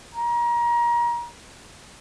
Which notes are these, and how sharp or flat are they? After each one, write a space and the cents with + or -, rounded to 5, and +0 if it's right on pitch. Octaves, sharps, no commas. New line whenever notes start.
A#5 +30